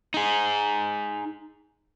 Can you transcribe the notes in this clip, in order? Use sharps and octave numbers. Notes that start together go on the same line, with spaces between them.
D#4 G#4